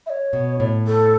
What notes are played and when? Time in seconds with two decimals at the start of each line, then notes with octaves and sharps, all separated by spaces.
0.06 E5
0.10 C#5
0.33 B2
0.60 A2
0.87 A4